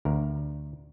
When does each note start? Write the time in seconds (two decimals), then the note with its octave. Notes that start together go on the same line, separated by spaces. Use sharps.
0.05 D2 A#4